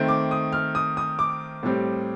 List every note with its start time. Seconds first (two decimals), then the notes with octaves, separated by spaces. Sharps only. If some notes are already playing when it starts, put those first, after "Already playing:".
Already playing: D#3 A3 C4
0.08 D6
0.31 D#6
0.53 F6
0.75 D#6
0.97 D#6
1.19 D6
1.63 A2 G3 C4